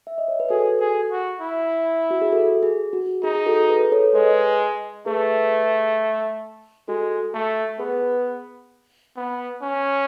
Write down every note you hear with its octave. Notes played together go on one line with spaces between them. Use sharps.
E5
D#5
C#5
B4
F#4 G#4 A4
G#4
F#4
E4
F#4
G#4
F#4 A4
G#4
F#4
D#4 G#4
G#4
F#4 A4
G#4 B4
A4 C#5
G#3 B4 D#5
A3 G#4 B4
G#3 F#4 A4
A3
B3 G#4 B4
B3
C#4